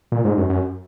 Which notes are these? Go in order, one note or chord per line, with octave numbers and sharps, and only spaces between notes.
A#2
G#2
F#2
F#2